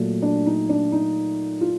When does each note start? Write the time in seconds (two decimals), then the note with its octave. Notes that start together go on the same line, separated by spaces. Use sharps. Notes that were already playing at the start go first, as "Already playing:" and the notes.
Already playing: A#2 F#3 A3
0.22 D4
0.46 D#4
0.69 D4
0.92 D#4
1.61 F4